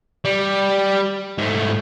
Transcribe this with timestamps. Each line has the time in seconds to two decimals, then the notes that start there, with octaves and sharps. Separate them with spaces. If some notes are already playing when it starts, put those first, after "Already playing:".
0.25 G3
1.38 G#2 A3